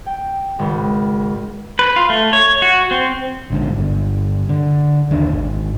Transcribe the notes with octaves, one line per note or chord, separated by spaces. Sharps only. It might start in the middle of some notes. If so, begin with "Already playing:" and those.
G5
G#1 C#2
B4
F4
A3
C#5
F#4
C4
A#1 G#2 D3
G1
D3
E1 D#2 D4
G#1